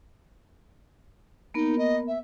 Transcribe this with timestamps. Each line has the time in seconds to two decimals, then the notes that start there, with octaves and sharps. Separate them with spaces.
1.54 A#3 B3 D#4 A#4
1.78 D#5
2.07 E5